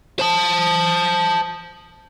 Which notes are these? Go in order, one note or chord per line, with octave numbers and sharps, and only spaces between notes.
C5 A5